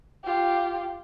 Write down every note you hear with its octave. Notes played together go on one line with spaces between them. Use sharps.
F4 G4